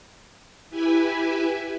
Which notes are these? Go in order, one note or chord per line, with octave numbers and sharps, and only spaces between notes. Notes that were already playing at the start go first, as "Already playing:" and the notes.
E4 G4 B4 E5 G#5